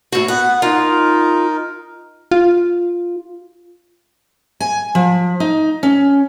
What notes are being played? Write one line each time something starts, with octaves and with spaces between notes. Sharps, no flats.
A2 F#4
B3 B4 F#5
D#4 F4 A#4
F4
G#5
F3
D#4
C#4